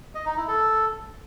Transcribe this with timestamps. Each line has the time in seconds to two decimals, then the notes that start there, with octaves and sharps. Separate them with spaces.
0.15 D#5
0.26 D#4
0.37 E4
0.48 A4